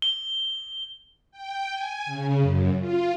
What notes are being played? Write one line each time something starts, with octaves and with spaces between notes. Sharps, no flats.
G7
G5
G#5
C#3
F#2
F4